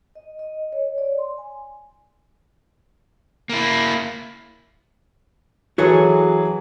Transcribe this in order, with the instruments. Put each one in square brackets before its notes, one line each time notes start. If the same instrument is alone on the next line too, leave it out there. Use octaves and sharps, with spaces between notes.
[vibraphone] D#5
D#5
C#5
D5
C6
G#5
[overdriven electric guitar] A#3 E4
[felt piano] E3 F#3 G#4 [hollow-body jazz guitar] F#4 A4 C#5